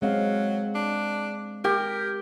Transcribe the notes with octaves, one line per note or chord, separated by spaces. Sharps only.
F#3 G#3 C4 F5
D4
G4 A#4